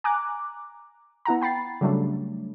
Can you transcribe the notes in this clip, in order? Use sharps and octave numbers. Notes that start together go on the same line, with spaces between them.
G#5 A#5 D6 F#6
B3 E4 F#5 A#5
G5 B5 A6 C7
C#3 F#3 G3 A3 D4